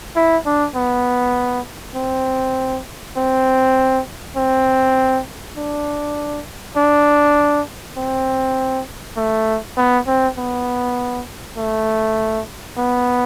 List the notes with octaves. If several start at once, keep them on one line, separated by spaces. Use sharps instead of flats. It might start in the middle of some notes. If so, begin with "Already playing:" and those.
E4
D4
B3
C4
C4
C4
D4
D4
C4
A3
B3
C4
B3
A3
B3